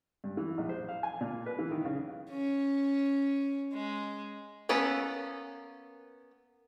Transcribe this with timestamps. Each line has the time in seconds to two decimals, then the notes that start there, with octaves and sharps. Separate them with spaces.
0.24 G2
0.37 E3
0.57 A#1
0.69 C5
0.89 F5
1.03 G#5
1.21 A#2
1.46 B4
1.59 E3
1.71 D#3
1.85 C#3
2.30 C#4
3.73 G#3
4.69 A#3 B3 C#4 A4 B4